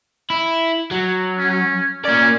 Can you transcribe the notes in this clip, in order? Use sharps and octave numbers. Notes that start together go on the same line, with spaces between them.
E4
F#3
C#4
A#3 C#4 D5